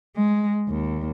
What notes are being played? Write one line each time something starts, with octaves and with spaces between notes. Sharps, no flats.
G#3
D#2